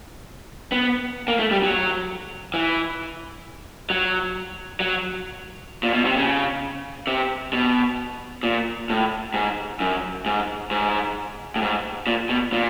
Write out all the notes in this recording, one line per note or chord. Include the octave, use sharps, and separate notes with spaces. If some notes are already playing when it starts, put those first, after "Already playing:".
B3
A#3
A3
G3
F#3
E3
F#3
F#3
A#2
B2
C3
C#3
C3
B2
A#2
A2
G#2
F#2
G#2
G#2
A2
G#2
A#2
B2
A#2